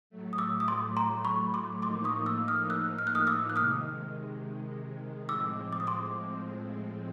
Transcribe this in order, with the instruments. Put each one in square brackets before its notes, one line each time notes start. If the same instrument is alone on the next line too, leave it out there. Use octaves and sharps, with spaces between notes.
[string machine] A2 F#3 A3
[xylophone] D#6
D6 E6
D#6
C6 D6
A#5 C6
B5 C#6
C6 D6
[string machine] A2 F3 A#3 D#4 [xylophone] C6 D6
[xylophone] C#6 D#6
D6 E6
D#6 F6
E6 F#6
F6
F#6
D#6 F6
D6 E6
F#6
[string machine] C3 D#3 G#3 [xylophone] D#6 F6
[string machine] A2 F3 G#3 C4 [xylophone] D6 E6
[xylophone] D6
D#6
C6 D6